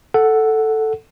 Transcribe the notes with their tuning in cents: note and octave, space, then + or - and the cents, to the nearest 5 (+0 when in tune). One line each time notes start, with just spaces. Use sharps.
A4 +0 F#5 +0